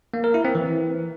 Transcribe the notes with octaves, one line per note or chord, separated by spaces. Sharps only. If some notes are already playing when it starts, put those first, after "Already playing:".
A#3
A#4
E4
C4
E3